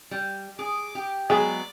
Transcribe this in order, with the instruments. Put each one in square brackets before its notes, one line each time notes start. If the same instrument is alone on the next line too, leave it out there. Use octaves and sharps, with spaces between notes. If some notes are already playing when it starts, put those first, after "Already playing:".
[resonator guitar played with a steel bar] G3
[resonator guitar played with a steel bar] G#4 [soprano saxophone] D6
[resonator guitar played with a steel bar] G4
[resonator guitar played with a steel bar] F#3 G#3 B3 [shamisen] G#4 [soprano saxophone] D5